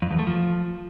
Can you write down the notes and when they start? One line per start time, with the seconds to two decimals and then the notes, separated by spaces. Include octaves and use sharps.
0.02 F2
0.10 E2
0.19 A3
0.27 F3